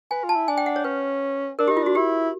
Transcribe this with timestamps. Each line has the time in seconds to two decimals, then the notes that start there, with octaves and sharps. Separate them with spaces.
0.11 B4 G#5
0.24 F4
0.29 A5
0.36 E4
0.48 D4 G#5
0.58 G5
0.66 F#5
0.76 C#5
0.84 C#4 B4
1.59 D4 A#4
1.68 G4
1.71 D#4
1.77 F4
1.83 D4 F#4
1.95 E4 G4